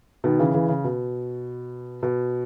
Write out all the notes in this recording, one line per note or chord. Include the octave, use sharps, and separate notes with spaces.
B2 D#3
C#3 E3
C#3 E3
C#3
B2
B2